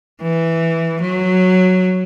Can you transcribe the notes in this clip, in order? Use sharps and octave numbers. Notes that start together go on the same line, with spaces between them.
E3
F#3